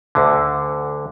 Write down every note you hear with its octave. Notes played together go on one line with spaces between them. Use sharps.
D2 D3